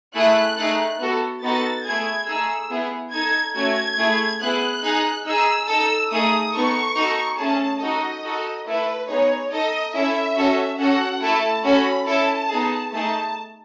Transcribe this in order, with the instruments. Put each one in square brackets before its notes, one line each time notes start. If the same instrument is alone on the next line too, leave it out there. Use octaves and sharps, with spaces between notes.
[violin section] A3 E4 G#4 F#6
A3 D#4 G#4
B3 F#4 A4
B3 D#4 F#4 A4 A6
A3 E4 G#4 G#6
A3 D#4 G#4 E6
B3 E4 G#4
D#4 A4 G#6
A3 C#4 F#4 G#6
A3 E4 G#4
B3 E4 G#4 F#6
D#4 G#4
D#4 G#4 E6
D#4 A4 E6
A3 D#4 G#4 D#6
B3 D#4 A4 C#6
D#4 F#4 A4
A3 C#4 G#4 A5
D#4 F#4 A4 D#5
D#4 F#4 A4
A3 E4 A4 B4
B3 D#4 G#4 C#5
D#4 A4 D#5
C#4 E4 A4 E5
C#4 F#4 A4
C#4 F#4 A4 F#5
A3 E4 A4 A5
C#4 F#4 A4 B5
C#4 E4 A4 A5
B3 D#4 G#4
A3 D#4 G#4 A5